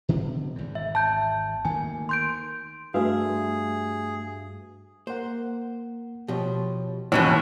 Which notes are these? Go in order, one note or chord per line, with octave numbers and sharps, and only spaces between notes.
B2 D3 D#3
G#1 E2
E5
A5 G6
D2 D#3 A#3 G#5
C6 G6 D7
G2 A3 F#4 G#4 B4 E5 F5
A#3 C5 F#5
B2 F3 G4 C#5
D#2 G#2 B2 E3 F3 G#3 C#4